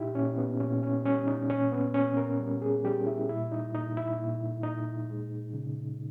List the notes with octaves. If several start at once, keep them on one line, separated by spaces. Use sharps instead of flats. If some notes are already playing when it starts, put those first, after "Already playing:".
Already playing: A#2 D#4 E4 G4
A#2 C#4
B3
A#2 C#4
C#4
G3 C#4
D#4
A#2 C#4
B3
A#2 C#4
A#4
G3
G#4
G3 G4
E4
A#2 E4
D#4
A#2 D#4
E4
A#2
A#2 D#4
G#3
C#3